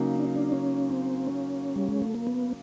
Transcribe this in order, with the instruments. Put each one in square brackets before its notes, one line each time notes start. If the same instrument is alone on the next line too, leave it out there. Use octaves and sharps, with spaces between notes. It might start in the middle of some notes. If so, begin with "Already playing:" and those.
Already playing: [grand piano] C#3 F#3 A#3 D#4
[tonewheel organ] D4
D4
C#4
C4
C#4
G3
G#3
A3
A#3
B3